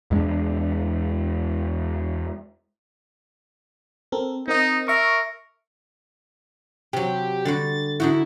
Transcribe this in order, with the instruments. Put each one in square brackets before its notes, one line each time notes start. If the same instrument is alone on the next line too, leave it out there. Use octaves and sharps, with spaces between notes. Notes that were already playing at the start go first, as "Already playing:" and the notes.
[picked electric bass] E2 G#3 A#3 D4
[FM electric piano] C4 A4 A#4
[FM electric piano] C4 A#4 D#5 [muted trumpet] D#4
[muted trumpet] A#4 [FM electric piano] E5 C#6
[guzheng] C3 F#3 [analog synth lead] G4
[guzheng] D3 G3 F#4 [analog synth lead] A6
[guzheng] D3 D#4 F#4 [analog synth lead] E4